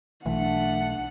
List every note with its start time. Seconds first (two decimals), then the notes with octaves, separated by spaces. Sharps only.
0.26 B1 E3 A3 D4 F#5